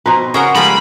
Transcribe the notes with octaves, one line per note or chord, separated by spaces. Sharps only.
B2 C4 B4 A#5 C6
C#3 B3 F#4 G#4 A#4 F#5
F3 G3 G#3 A#3 B5